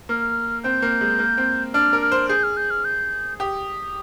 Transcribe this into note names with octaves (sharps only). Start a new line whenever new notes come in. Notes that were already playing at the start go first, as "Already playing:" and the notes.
A#3 F6
C4 G6
A#3
G#3
A#3
C4
D4 F6
A#4
F6
C5
G#4 G6
F6
G6
F6
G6
G4 D#6